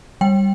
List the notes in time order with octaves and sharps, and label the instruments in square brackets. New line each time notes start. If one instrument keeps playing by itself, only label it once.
[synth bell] G3 G5